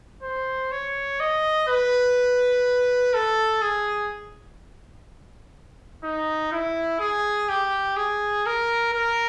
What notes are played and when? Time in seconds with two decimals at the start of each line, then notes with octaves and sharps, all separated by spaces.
0.23 C5
0.72 C#5
1.20 D#5
1.68 B4
3.13 A4
3.62 G#4
6.04 D#4
6.52 E4
7.00 G#4
7.49 G4
7.97 G#4
8.46 A#4
8.93 A#4